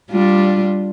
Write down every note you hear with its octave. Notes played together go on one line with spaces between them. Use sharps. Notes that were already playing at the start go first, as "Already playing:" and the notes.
G3 D4 F4